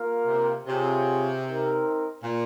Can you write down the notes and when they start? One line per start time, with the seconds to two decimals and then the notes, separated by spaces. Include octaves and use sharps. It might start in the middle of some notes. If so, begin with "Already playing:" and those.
Already playing: A#3 F4 A#4 F5
0.27 C3
0.66 C3 C4 F4 G#4 C#5
1.45 C4 D#4 A#4
2.23 A#2